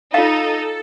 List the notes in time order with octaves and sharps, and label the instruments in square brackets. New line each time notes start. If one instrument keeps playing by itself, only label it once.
[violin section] D#4 [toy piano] F4 F5 [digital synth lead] A4